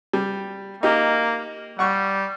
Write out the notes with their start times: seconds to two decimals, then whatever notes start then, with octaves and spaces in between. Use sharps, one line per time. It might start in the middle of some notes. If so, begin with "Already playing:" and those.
0.13 G3
0.83 A#3 D#4 G4
1.79 G3 F#5 C#6